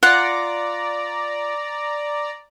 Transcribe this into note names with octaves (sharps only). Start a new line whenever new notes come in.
F4 D5 F#5 A#5